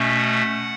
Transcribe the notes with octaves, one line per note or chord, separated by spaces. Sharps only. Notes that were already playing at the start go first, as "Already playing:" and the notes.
Already playing: B2 A3 C#4
F#5